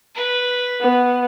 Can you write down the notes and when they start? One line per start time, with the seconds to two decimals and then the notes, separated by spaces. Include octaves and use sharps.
0.15 B4
0.81 B3